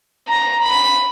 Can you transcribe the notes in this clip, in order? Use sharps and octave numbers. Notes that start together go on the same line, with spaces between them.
A#5
B5